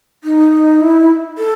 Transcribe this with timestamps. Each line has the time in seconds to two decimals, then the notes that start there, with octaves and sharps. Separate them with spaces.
0.24 D#4
0.81 E4
1.38 A4